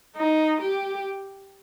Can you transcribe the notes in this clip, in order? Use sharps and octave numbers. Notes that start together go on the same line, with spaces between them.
D#4
G4